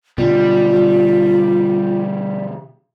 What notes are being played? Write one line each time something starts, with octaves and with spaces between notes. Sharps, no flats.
B2 D3 G3 F4